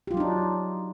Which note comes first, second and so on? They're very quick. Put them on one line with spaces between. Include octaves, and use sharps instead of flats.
G4 F4 F#3 D#4 D4